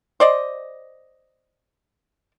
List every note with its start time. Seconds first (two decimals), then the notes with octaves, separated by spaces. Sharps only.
0.20 C5 D5 D#5